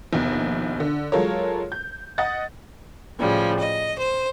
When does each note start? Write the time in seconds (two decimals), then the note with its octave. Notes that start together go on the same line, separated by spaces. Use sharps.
0.13 A#1 D#2 B2
0.80 D3
1.12 F#3 G#3 F4 A4 A#4 C#5
1.72 G6
2.18 D#5 F#5 A6
3.19 A2 C#3 F3 G3
3.59 D#5
3.98 C5